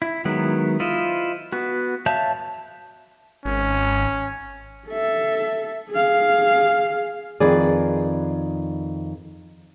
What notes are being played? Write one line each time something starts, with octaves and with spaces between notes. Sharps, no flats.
E4
D#3 F#3 G#3 B3 E4
E4 F4 C5 D#5
B3 F#4
C#5 E5 F5 A5 G6
G#1 C#4
A4 E5
G#4 F5
F2 D#3 G#4 B4 D5